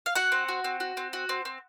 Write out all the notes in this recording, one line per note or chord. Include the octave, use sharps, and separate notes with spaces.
F5
F#4 F#5
C4
F#4
C4
F#4
C4
F#4
C4
C4